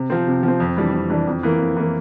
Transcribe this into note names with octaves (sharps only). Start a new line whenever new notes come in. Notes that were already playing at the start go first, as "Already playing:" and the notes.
Already playing: C3
F3 C4
C3
F3
C4
F2
E3 G3 D4
F2
E3 G3 D4
F2
E3 A#3
F2
E3 A#3